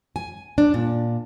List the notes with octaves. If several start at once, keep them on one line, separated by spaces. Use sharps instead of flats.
G#5
D4
A#2